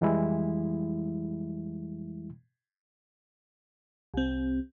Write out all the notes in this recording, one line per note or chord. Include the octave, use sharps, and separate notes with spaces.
F2 E3 G3 G#3 E4
C2 C4